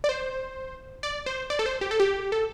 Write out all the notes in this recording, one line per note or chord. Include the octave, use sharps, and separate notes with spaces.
D5
C5
D5
C5
D5
A4
C5
G4
A4
G4
A4